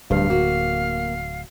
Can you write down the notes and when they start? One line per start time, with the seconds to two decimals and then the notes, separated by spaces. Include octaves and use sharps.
0.10 D1 D2 G2 F5
0.30 A#3 F#4